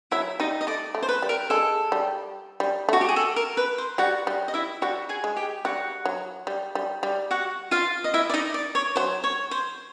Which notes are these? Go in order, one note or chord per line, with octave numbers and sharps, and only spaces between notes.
F#3 E4 E5
G3 D#4 D#5
D#5
A3 D5
A3
C5
B4
G3
A#4
G#3 A4
G3
G3
A3 F#4
G4
G#4
A4
A#4
B4
C5
G3 F#4 F#5
G3
D#5
E4 E5
G3 F#4 F#5
G#4 G#5
G#3
G4 G5
G3 F#4 F#5
F#3
G3
G3
G3
F#4 F#5
F4 F5
D#5
E4 E5
D5
D#4 D#5
D5
C#5
F#3 C5
C#5
C5